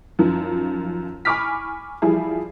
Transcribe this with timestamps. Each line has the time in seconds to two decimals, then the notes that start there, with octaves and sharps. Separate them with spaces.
0.19 F#2 D#3 F3
1.25 G#5 B5 C#6 D6 F6 B6
2.02 E3 F3 G3 E4 G#4